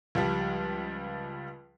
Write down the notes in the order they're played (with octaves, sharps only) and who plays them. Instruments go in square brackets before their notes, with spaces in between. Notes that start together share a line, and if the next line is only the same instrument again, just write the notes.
[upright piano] C#2 F3 G3